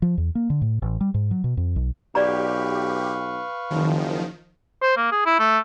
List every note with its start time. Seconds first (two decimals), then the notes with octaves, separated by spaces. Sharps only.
0.02 F3
0.18 E2
0.35 A#3
0.50 D3
0.62 A2
0.82 A1
1.01 G3
1.14 G#2
1.31 F#3
1.44 B2
1.57 F2
1.76 B1
2.15 B1 G4 B4 D5 F5 A#5 C#6
3.70 F#1 D#3 F3
4.83 C5
4.97 A#3
5.12 G#4
5.26 E4
5.39 A3